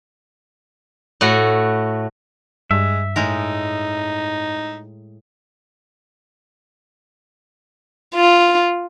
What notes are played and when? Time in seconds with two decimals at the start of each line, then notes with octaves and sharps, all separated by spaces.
1.21 A2 A3 F#4
2.71 G2 G#3 E5
3.16 A2 G#3 D#4 A#4
8.15 F4